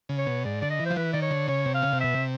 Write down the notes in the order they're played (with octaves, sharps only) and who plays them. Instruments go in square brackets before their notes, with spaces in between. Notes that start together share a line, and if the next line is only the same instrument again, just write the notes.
[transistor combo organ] C#3
[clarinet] C#5
[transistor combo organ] B2
[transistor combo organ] G#2 [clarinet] D5
[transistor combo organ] D3 [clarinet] D5
[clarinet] D#5
[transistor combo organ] E3
[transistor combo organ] F3 [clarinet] C5
[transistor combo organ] E3 [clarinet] B4
[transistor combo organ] D#3 [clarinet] D5
[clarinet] C#5
[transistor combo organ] D3
[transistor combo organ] C#3 [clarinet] C#5
[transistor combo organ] C3
[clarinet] F5
[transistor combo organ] C#3
C3
[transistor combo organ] B2 [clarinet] E5
[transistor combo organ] C3